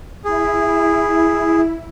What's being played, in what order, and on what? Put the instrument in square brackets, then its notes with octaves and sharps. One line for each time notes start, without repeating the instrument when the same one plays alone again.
[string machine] E4 [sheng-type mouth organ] G#4